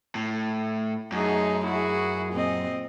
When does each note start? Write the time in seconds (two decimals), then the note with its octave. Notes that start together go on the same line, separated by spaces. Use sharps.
0.15 A2
1.12 F#2 A3 D#4 G#4
1.64 E4 F#4 G#4
2.31 A#2 C4 D#5